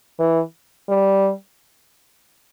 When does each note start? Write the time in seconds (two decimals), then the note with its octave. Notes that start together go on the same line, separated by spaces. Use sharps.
0.19 E3
0.89 G3